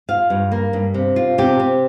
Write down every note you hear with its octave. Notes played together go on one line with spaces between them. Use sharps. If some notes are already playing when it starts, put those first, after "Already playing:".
F4 F5
G2
A#3
G2
C3
F4
C3 G4
C3